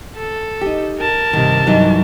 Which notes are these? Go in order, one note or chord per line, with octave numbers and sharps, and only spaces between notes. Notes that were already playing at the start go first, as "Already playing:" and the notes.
A4
D#4 G4
A#4 A5
G2 C3 D#3
G2 E3 F#3 D#4